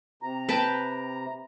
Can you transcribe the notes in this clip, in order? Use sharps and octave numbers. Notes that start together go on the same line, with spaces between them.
C3 A#5
B4 G5 A5